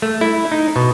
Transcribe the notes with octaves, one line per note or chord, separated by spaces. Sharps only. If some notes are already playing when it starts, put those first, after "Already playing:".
A3
E4
D#4
B2